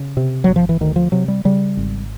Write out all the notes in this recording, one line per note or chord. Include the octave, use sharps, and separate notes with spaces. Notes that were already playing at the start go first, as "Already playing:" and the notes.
Already playing: C#3
C3
G1 F#3
F3
E3
D2 D#3
F3
C3 F#3
G3
C#3 G3
G#1